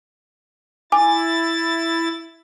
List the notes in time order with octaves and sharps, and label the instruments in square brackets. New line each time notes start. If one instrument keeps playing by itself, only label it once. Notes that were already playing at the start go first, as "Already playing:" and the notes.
[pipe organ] E4 A6 [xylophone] G#5 D6